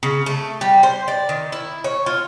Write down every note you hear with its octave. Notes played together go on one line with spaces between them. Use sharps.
C#3
A3
G3
C5
D5
D#3
E4
C#5
F4